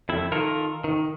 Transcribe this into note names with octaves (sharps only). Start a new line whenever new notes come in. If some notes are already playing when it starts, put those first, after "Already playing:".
F2 E4
D#3 F4 A4 A#4
D#3